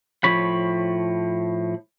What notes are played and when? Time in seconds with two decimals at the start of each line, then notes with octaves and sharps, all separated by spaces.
0.24 A2 F3 C#5 B5